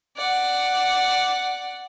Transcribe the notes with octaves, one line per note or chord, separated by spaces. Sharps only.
D5 F#5